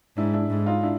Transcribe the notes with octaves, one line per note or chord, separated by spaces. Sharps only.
G#2 D4 E4
D4 E4
G#2
D#4 F4
D4 E4